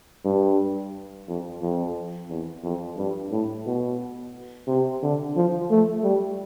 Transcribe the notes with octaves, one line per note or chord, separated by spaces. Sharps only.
G2
F2
F2
E2
F2
G2
A2
B2
C3
D3
F3
A3
G3